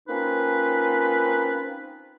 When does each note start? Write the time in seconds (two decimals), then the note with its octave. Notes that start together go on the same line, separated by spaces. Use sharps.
0.07 A#3 C4 C#4 D#4 F4 B4